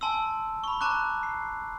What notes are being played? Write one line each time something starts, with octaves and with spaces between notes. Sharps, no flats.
G#5 A5 C6 E6
B5 C#6
A5 A#5 C#6 D6 F#6
C7